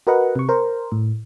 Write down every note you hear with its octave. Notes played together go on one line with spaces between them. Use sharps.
F#4 A#4 B4 D#5 F#5
C3 C#6
A#4 C5
A2